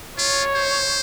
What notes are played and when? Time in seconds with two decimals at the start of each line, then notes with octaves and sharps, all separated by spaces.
0.18 F4 C#5
0.55 C5